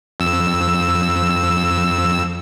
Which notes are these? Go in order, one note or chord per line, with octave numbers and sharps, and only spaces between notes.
F2 E6